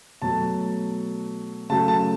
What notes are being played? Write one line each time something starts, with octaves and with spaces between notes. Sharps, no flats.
B2 F#3 A3 A5
C#3 F#3 A3 A5
A5